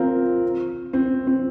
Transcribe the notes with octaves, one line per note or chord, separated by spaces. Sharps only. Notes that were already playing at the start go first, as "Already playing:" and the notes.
Already playing: C4 F4 A#4
C4
C4